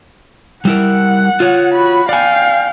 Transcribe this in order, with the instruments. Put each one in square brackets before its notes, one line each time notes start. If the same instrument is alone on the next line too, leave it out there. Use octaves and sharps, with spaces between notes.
[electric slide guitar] G3 E4 A#4 [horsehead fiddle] F#5
[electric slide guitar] F4 C#5
[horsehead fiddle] F#4 B5
[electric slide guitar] D5 G#5 [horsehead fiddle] F5 G5